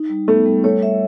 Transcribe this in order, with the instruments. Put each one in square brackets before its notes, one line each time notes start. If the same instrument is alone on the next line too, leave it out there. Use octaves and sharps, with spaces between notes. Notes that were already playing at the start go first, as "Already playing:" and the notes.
Already playing: [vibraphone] D#4
G3
[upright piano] A3 [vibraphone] B3
[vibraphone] G3
[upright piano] A3 [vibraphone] C#5
[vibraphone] E5